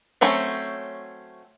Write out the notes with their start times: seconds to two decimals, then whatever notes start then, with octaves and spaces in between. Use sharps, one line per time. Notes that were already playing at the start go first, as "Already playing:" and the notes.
0.21 F#3 A3 C4 C#4